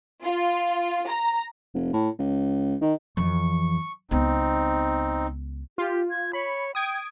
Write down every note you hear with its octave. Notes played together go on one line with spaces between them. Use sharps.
F4
A#5
F1
A2
C#2
D#3
F2 E3 C#6
C#2 B3 C4 D#4
F4 G4
G#6
C#5 B5
G5 D#6 G#6 D7